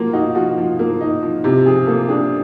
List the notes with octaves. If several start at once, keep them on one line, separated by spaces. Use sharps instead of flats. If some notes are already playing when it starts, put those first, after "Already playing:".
Already playing: F3 A#3 F4 F#4
D#4 F#4
F3 F#4
F3
A#3
D#4
F3
C3 G4
F3 G#4
A#3 A4
D4 G#4